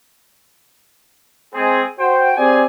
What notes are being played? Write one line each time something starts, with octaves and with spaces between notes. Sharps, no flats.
G#3 C4 G#4
F#4 C5 G5
C4 G4 G#4 D5 G#5